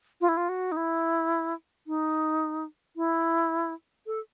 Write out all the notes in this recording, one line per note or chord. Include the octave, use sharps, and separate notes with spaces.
F4
E4
F4
F#4
D#4
E4
D#4
E4
A4